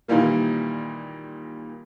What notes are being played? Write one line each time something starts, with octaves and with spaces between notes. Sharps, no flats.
A#2 D#3 E3 G3 A#3